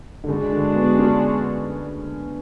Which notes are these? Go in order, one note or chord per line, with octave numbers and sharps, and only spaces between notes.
D3
C#3 G#3 D4 F#4
D3
B3
C#4